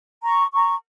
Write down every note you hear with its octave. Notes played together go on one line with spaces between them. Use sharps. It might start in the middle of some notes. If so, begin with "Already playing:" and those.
A#5 C#6
A#5 C#6